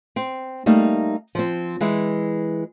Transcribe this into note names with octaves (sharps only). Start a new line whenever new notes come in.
C4
G3 A3 A#3 D#4
F3 C4
E3 G#3 E4